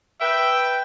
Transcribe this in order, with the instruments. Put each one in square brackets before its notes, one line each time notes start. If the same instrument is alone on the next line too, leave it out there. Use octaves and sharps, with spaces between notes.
[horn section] B4 G5 [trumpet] E5